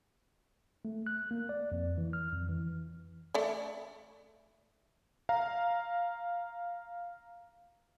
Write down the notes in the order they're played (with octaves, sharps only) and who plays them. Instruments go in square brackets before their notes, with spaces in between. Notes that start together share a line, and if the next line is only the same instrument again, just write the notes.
[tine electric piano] A3
F#6
A#3
D5
F2
E3
F6
F2
E3
[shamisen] A3 D5
[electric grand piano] F5 A#5